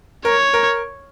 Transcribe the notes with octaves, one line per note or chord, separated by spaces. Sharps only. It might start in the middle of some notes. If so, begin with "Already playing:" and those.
A#4 C#5
A#4